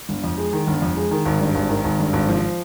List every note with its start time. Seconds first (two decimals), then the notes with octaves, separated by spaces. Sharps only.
0.09 G1
0.24 F2
0.37 G#3
0.53 D#3
0.67 G1
0.82 F2
0.97 G#3
1.11 D#3
1.26 G#1
1.40 G2
1.55 G#1
1.69 D#3
1.84 G#1
1.99 G2
2.13 G#1
2.29 F3